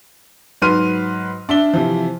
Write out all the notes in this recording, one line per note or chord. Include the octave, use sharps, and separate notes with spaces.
G#2 F#3 B4 C6 F6 D#7
D4 E5 G7
C3 E3 F3